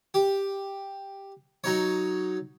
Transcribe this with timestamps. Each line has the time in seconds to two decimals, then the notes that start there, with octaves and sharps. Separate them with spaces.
0.14 G4
1.64 F#3 D#4 C#5